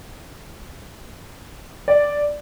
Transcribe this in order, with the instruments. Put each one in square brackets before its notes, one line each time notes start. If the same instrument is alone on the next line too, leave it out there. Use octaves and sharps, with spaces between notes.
[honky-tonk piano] D5